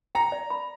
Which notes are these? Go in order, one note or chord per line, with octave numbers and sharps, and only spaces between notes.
G5 A#5
D5
B5